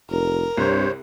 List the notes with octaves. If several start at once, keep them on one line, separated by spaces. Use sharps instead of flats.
F1 A#4
C2 G2 C5 C#5